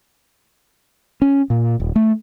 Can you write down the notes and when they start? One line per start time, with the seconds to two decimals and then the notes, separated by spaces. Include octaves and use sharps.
1.22 C#4
1.50 A#2
1.80 D#1
1.96 A3